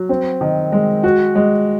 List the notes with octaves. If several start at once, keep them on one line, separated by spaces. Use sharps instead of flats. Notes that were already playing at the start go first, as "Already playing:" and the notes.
Already playing: F#3
C4
D#3
G#3
F#4
G#3